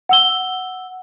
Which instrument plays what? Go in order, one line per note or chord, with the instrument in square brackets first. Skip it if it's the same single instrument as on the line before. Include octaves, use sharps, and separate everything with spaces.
[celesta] F#5 E6 G7